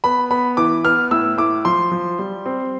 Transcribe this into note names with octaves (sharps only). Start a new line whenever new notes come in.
B3 B5
B3 B5
E3 D6
B3 F6
A2 E6
A2 D6
F3 C6
F3
G3
C4